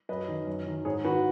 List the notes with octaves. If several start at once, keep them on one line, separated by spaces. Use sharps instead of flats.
F#2 B4 D#5
D#3
F#2
D#3
G#2 G#4 C#5
D#3 F#4 B4